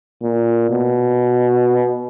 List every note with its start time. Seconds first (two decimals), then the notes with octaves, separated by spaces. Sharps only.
0.23 A#2
0.70 B2